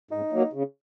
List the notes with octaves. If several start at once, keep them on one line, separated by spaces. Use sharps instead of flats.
G#2 D#4
F#3 A#3
C#3